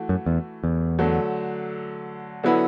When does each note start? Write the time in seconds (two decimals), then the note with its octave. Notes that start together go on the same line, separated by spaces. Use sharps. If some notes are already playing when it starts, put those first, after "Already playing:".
Already playing: E3 A3 F#4
0.09 F#2
0.26 E2
0.64 E2
0.99 D3 F#3 A3
2.43 D3 F#3 B3 E4 B4